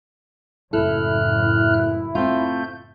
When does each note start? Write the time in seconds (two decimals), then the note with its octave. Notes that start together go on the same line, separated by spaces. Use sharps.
0.73 F#1 A2 E4 A4 F6 F#6
2.15 A3 C4 F4 G6